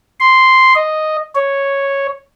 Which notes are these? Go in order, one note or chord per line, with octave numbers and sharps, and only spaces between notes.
C6
D#5
C#5